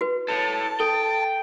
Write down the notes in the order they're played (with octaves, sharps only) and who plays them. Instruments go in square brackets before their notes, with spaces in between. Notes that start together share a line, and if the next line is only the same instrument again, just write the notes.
[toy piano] F#4 B4
[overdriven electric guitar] A4 C#5 [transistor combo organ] A5
[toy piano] A4 [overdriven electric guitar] G5